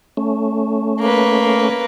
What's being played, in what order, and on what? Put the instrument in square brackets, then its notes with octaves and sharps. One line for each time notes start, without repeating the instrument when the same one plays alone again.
[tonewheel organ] A3 C#4
[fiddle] A#3 B4